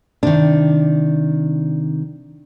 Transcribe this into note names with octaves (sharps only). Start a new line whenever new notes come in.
C3 D#3 D4